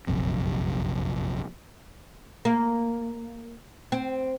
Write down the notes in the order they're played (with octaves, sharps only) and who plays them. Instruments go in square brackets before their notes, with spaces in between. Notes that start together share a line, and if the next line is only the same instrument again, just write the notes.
[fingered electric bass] F1 A#1 F#2 C3
[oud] A#3
C4